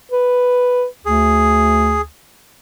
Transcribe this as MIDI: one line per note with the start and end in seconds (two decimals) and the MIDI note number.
0.12 0.86 71
1.05 2.04 38
1.05 2.01 68